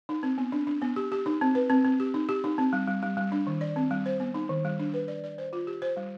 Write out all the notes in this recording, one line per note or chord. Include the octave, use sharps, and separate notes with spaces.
D#4
C4
B3
D4
D4
B3
G4
G4
D#4
C4
B4
C4
C4
G4
D#4
G4
D#4
C4
G3
G3
G3
G3
D4
D#3
D5
C4
G3
C5
B3
D#4
D#3
G3
D4
B4
D5
D5
C5
F4
G4
C5
G3